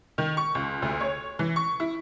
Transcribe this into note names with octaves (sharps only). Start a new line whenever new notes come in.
D#3
C#6
C#2
D2
C#5
E3
C#6
E4